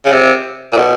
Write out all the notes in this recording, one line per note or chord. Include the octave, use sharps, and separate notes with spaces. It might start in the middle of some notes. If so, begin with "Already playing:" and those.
C#3
C3
A#2
B2